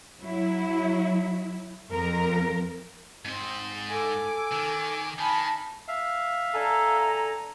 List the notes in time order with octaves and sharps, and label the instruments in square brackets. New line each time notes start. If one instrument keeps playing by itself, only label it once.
[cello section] F#3 E4
F2 A#4
[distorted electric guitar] G#2 D#5 [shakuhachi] C4
[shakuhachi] A4 [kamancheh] G#5 D6
[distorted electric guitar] D#3
[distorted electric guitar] D#3 [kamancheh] G#5 B5 [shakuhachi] A5
[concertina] E5 F5
[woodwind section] D3 G#5 A#5 [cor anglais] A4